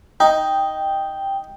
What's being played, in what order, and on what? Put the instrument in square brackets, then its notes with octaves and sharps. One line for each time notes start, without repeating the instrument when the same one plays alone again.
[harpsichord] D#4 [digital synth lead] G5